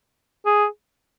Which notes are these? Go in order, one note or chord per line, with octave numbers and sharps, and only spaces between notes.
G#4